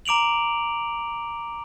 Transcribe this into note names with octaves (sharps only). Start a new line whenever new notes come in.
A#5 D6 D7 F7 F#7